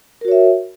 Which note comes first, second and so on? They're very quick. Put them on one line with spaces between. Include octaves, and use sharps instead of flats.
A#4 F#4 C#5 E5